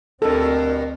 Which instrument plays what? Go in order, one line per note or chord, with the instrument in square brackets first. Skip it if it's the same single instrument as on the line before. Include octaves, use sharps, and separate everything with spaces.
[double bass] D2 C4 [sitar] G2 B2 [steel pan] A4 [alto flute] A#4